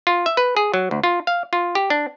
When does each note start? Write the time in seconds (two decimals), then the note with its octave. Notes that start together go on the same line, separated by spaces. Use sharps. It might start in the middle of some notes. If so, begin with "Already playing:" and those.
0.07 F4
0.26 E5
0.37 B4
0.57 G#4
0.74 F#3
0.91 D2
1.04 F4
1.27 F5
1.53 F4
1.75 G4
1.90 D4